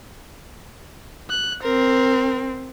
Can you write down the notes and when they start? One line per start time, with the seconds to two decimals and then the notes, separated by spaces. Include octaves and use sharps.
1.30 F#6
1.63 C4 A#4